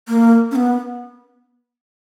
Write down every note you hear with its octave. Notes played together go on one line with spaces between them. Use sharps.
A#3
C#4
B3